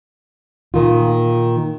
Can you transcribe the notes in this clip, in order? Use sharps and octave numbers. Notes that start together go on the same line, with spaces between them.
A#2 D#3 F4